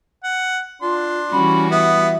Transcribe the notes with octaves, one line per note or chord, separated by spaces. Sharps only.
F#5
D4 F4 C6
E3 G3 C#4 F#4 B5
B3 E5 D#6